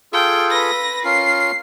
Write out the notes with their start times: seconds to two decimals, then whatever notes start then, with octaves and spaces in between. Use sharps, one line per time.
0.13 F4 G#4 A4 G5
0.50 B4 A#6
1.04 C#4 F4 A#4 C7